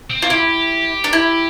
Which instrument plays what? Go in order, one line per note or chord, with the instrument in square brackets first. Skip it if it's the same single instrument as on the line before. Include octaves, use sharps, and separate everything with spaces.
[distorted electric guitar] C4
[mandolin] F4
[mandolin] E4 [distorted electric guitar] G4
[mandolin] D4
E4